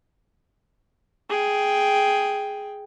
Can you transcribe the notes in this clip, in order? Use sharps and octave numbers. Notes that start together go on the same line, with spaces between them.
G#4 G5